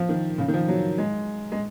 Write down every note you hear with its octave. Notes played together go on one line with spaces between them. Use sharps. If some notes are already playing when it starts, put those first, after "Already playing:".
Already playing: F3
D#3
C#3
D#3
F3
F#3
G#3
G#3